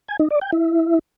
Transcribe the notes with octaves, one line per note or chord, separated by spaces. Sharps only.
G#5
D#4
D5
G5
E4